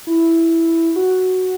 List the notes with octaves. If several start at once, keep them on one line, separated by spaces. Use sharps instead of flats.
E4
F#4